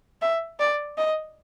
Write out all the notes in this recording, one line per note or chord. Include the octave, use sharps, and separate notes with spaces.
E5
D5
D#5